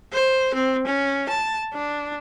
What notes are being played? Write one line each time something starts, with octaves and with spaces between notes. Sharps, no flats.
C5
C4
C#4
A5
D4